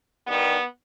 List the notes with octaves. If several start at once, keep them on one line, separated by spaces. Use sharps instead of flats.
G2 D#3 G3 B3